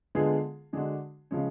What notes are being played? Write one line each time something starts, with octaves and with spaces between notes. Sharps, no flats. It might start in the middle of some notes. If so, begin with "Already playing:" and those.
D3 G#3 B3 F4 G#4
D3 G#3 D4 F#4
C#3 F3 G#3 C#4